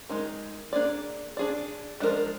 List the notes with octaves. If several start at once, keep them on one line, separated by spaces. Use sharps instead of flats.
G#3 D#4 A#4
A#3 D4 G#4 D5
D4 G#4 D5
F3 G#3 D4 F4 A#4